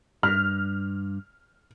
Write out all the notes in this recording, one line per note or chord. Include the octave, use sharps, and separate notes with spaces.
G2 F6